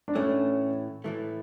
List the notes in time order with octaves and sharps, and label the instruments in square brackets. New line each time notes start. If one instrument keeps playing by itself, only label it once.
[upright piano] D4
[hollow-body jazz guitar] A2 E3 A3 [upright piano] C#4
[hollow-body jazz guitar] A2 E3 A3